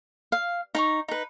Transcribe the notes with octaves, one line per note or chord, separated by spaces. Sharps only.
F5
D#4 A#5 C#6
D#4 B4